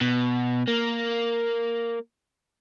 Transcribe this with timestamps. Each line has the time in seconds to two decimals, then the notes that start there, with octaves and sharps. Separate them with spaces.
0.01 B2
0.68 A#3